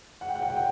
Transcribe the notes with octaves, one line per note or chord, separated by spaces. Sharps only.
F#5
G5
F#5
G5
F#5
G5